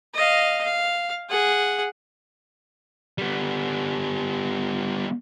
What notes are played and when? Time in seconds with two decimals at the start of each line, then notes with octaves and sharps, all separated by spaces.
0.14 D#5 F5
0.63 F5
1.30 G#4 F#5
3.18 G3 B3